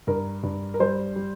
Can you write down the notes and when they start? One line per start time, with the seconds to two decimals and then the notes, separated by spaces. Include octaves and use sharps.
0.07 G2 A#4
0.43 G2
0.74 A#4
0.79 G3 C5
1.16 G3